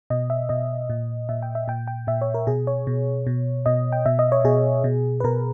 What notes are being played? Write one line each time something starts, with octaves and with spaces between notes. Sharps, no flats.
B2 D#5
E5
B2 D#5
A#2
A#2 E5
G5
E5
A#2 G5
G5
A#2 E5
C#5
A#4
B2 G#4
C#5
B2
B2
B2 D#5
G5
B2 E5
D#5
C#5
B2 G#4
B2
B4
B2 A#4